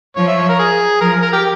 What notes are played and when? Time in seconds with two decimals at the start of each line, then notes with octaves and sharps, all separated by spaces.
0.16 F3 C#5
0.27 E5
0.38 C#5
0.49 A#4
0.59 G#4
1.01 F3 A#4
1.22 A#4
1.33 G4